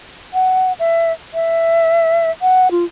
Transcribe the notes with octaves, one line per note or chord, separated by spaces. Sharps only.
F#5
E5
E5
F#5
F4